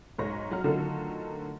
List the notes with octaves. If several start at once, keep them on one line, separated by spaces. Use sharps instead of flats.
B1 G#2 C#5 A#6
F#3 F#4 F6
D3 D#3 F#3 A3 F4 A4